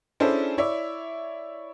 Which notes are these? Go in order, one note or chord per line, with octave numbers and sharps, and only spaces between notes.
C#4 D4 E4 G#4 A4 C5
E4 C#5 D5 E5